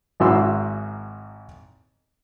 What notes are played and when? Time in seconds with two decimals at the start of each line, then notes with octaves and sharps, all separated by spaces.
0.20 G#1 G#2 E4 F#4 C6 E6